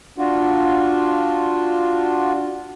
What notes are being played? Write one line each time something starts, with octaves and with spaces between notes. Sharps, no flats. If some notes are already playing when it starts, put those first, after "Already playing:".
D4 F4 F#4